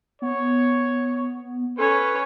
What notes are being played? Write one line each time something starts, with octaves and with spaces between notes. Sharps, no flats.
B3 C#5
C#4 A4 B4 C#5